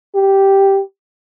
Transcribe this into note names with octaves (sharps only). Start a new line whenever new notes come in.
G4